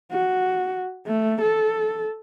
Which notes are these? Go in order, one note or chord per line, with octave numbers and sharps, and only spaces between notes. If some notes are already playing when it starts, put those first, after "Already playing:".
F#4
A3
A4